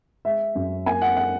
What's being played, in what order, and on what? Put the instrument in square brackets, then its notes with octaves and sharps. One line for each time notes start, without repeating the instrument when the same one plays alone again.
[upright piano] G#3 E5
F#2
A#3 G#5
F#5
F#5